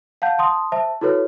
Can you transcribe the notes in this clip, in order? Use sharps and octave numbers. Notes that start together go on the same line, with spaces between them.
F5 F#5 A5 G6
A5 C6 D#6
C5 E5 A5
E4 F#4 A4 B4 C#5